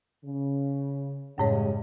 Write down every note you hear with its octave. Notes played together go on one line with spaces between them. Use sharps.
C#3
F#2 A2 C#3 G3 G#3 C#5